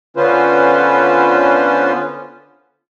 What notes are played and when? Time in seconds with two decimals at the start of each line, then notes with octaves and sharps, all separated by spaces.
0.17 D3 B3 C#4 F4 B4 C5